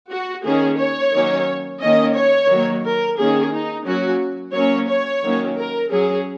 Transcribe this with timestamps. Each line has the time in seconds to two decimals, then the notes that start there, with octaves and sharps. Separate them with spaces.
0.10 F#4
0.44 D#3 A#3 C#4 G#4
0.78 C#5
1.12 D#3 F#3 A#3 C#4
1.80 D#3 A#3 C#4 D#5
2.15 C#5
2.49 D#3 F#3 A#3
2.83 A#4
3.18 D#3 A#3 C#4 G#4
3.52 D#4
3.86 F#3 A#3 C#4 F#4
4.54 F#3 A#3 C#4 C#5
4.88 C#5
5.23 D#3 F#3 A#3 C#4
5.57 A#4
5.91 F#3 C#4 G#4